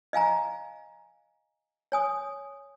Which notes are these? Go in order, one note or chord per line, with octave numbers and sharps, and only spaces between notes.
D#5 F5 G#5 A#5
C#5 G#5 D#6